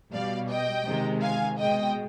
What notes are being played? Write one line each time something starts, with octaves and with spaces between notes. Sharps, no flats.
B2 G3 D5 F5
D#5 G5
C3 D#3 G#3
F5 G#5
B2 G#3 D#5 G5